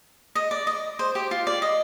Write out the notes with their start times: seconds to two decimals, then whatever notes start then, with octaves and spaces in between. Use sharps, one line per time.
0.35 D#5
0.51 D5
0.67 D#5
0.99 C5
1.15 G4
1.31 F4
1.47 D5
1.62 D#5